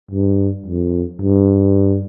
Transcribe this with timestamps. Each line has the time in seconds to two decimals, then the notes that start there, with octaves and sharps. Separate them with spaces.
0.11 G2
0.66 F2
1.21 G2